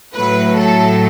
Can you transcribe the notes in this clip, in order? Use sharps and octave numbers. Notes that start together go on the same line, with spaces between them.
A2 F#3 A3 B4
A4